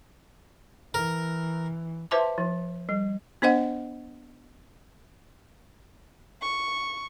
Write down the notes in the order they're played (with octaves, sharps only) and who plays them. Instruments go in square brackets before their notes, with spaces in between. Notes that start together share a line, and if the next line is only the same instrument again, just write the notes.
[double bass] E3 [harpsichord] A#4
[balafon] B4 C5 E5 A5 C6 D6
F3
G3
B3 D4 C5 D#5 F#5
[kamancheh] C#6